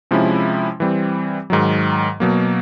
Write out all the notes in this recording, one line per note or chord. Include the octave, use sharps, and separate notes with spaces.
C3 F3 G#3 C#4 E4
E3 G3 C4
G#2 D#3 F#3
B2 F#3 A#3